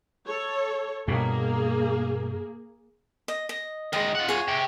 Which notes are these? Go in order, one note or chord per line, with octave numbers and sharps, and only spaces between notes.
A4 C#5
G2 B2 A#3 G#4
D#5
D#5
D#3 G#3 D#5
F4 F#5
G#4 C#5
C3 G4